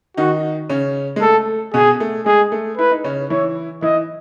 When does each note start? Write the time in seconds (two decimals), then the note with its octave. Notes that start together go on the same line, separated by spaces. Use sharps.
0.17 D#3 D#4 F#4
0.69 C#3 C#4
1.16 G#3
1.21 A3 A4
1.74 B2 B3 G#4
2.00 A3
2.26 G#3 G#4
2.52 A3
2.78 E4 B4
2.92 D#4
3.04 C#3 C#4
3.30 E3 E4 C#5
3.82 E3 E4 D#5